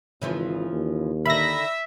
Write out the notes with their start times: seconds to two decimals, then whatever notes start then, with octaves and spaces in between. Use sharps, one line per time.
0.22 G#1 C#3 E3 F3
0.72 D#2
1.26 D3 D#3 E5 B5 A#6